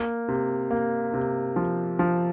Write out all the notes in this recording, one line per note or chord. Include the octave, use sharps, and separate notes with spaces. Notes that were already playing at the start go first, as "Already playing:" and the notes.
Already playing: A#3
C3
A#3
C3
F3
F3